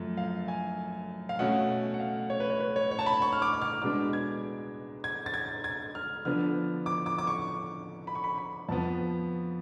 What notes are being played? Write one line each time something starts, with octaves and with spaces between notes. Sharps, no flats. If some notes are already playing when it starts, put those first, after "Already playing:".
Already playing: F#2 F3 A3
F5
G#5
F5
B2 A3 C#4 F#5
F#5
F5
C#5
B4
C#5
B4
C#5
C#5
A5
B5
C#6
F6
D6
D6
F6
B2 G#3 B3 D4 D6
G#6
G#6
A6
G#6
G#6
F6
D3 F3 B3 D4 F6
D6
D6
D6
C#6
B5
C#6
B5
B5
F2 F3 B3 A5